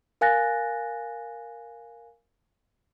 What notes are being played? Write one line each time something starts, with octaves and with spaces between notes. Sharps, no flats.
A#4 F5 G#5 F#6 A6 A#6